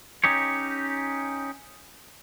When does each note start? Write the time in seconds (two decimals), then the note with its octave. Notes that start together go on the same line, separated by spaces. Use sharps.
0.24 C#4 D#4 G4 C#5